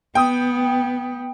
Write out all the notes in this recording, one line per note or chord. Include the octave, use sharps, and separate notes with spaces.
B3 G5 D#6